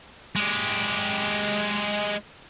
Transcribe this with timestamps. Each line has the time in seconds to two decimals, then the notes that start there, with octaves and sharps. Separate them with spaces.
0.36 G#3 G4